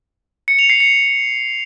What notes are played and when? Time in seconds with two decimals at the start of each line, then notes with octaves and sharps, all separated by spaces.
0.48 C#7
0.59 F7
0.70 C7
0.80 C#7